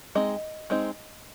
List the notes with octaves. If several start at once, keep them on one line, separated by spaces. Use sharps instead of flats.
G#3 C4 D#4 D#5
G#3 C4 D#4